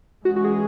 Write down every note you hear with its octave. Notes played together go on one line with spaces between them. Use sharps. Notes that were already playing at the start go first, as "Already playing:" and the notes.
E3 G#3 C#4 F#4
F#4
G#4